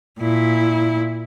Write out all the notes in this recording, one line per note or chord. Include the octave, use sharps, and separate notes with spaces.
A#2 E4